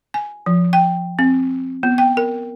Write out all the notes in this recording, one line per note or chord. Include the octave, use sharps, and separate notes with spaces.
G#5
F3
G5
C4
B3
G5
A#4